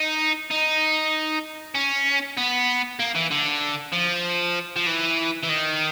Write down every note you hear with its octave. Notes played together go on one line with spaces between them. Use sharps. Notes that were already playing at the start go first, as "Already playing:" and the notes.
Already playing: D#4
D#4
C#4
B3
A#3
E3
D3
F3
F3
E3
E3
D#3